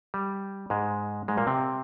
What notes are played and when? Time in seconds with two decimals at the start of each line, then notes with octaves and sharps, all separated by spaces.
0.14 G3
0.70 G#2 G#3
1.28 G#2 G#3
1.37 A#2 A#3
1.47 C3 C4